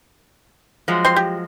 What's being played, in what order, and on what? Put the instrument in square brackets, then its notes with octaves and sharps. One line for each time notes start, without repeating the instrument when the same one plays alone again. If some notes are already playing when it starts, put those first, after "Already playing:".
[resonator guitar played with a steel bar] F3 F#3 G#3
[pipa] C4 C6
G4